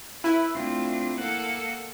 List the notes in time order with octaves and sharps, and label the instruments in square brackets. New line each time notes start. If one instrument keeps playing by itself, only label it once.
[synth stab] E4 [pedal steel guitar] B4
[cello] A3 D4 [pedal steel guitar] C4 F4
[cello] A#3 A4 [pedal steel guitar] F#5